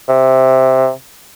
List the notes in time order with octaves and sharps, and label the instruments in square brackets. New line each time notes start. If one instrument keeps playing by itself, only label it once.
[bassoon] C3